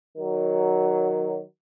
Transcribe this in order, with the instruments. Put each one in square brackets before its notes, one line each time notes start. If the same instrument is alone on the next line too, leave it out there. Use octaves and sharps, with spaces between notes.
[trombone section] D#3 F#3